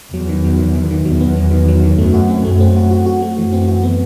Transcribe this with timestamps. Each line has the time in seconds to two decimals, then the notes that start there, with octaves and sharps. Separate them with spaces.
0.13 E2 F#3
0.29 D#3
0.44 F#3
0.59 D#3
0.75 D#3
0.91 D#3
1.05 E2 F#3
1.21 B3
1.36 F#3
1.51 D#3
1.68 F#3
1.83 D#3
1.98 F#2 A3
2.14 F#4
2.29 C4
2.45 F#2 A3
2.61 C4
2.76 F#4
2.91 F#4
3.06 F#4
3.22 A3
3.37 F#2 E3
3.53 C4
3.68 F#4
3.83 B3